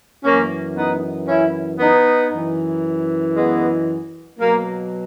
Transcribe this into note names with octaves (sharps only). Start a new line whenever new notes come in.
F#2 E3 A#3 C#4
B3 D#4
C#4 E4
B3 D#4
F#2 E3
G#3 B3
B2 F#3 A#3